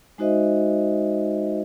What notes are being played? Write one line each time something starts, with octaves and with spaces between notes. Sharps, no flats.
G#3 D#4 F#4 C5 D#5 E5